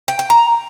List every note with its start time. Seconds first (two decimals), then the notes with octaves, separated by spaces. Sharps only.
0.08 G5
0.19 G5
0.30 A#5